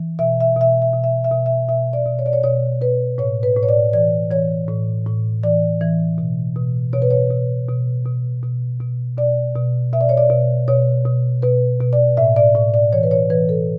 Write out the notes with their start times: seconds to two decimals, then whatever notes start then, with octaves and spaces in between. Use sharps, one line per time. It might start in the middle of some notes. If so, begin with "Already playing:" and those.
Already playing: E3
0.19 B2 E5
0.40 E5
0.56 B2 E5
0.82 E5
0.94 B2
1.04 E5
1.24 E5
1.31 B2
1.46 E5
1.69 B2 E5
1.93 D5
2.06 B2
2.19 C#5
2.26 D5
2.33 C#5
2.43 B2 C#5
2.81 B2 B4
3.18 A2 C#5
3.43 B4
3.56 A2
3.63 C#5
3.69 D5
3.93 E3 D5
4.31 E3 C#5
4.68 A2
5.06 A2
5.43 E3 D5
5.81 E3
6.18 B2
6.56 B2
6.93 B2 C#5
7.02 B4
7.10 C#5
7.30 B2
7.69 B2
8.06 B2
8.43 B2
8.81 B2
9.18 B2 D5
9.55 B2
9.93 B2 E5
10.01 D5
10.09 C#5
10.17 D5
10.30 B2
10.68 B2 C#5
11.05 B2
11.42 B2 B4
11.80 B2
11.93 D5
12.17 A2 E5
12.36 D5
12.55 A2 D5
12.74 D5
12.93 E3 C#5
13.03 B4
13.11 C#5
13.30 E3 B4
13.49 A4